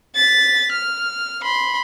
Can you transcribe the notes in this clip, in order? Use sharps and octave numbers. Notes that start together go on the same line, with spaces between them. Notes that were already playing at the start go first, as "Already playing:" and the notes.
A6 B6
F6
B5 C6